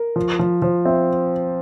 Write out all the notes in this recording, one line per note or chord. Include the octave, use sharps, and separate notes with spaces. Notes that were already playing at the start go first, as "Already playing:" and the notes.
Already playing: A#4
F3
F3
F3 C5
C4 E5